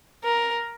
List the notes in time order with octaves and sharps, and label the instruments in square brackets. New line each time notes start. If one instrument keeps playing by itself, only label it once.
[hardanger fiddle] A#4